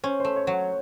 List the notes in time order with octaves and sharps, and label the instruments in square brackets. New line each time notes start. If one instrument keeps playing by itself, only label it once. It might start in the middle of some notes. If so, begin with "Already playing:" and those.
[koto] C#4 [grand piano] C5
[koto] A3 [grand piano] C5
[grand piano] C#5
[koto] F#3 [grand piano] F#5